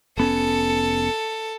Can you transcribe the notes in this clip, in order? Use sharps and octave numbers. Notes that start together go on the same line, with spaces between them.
F1 B3 C#4 A4 C#7